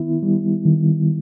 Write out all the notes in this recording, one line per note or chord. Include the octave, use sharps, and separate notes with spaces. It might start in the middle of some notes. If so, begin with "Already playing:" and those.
Already playing: D#3 B3 E4
G3
D#3